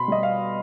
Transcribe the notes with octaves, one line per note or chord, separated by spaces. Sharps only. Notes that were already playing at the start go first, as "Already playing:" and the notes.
Already playing: B2 B5 C6
G3 D#5
F5